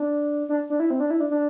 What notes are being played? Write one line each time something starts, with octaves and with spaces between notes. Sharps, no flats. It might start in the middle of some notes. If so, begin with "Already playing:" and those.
Already playing: D4
D4
D4
E4
C4
D4
E4
D4
D4